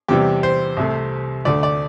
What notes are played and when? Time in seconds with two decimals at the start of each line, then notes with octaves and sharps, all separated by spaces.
0.08 E2 C3 E3 G3 G4
0.43 C5
0.77 C2 C3 A3
1.45 D2 D3 A3 D5
1.63 D5